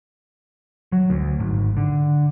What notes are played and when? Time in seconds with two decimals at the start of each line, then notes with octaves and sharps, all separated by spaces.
0.92 F#3
1.10 D2
1.40 G#1
1.77 D3